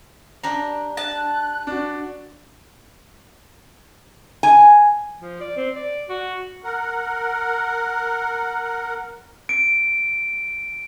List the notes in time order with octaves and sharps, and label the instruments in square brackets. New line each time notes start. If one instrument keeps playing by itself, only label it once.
[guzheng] D4 G4 A#5
[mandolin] A5 [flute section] F#6
[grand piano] D4 F#4
[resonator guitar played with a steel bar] G#5
[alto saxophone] F3
D5
C4
D5
F#4
[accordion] A#4 F#5
[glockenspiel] D7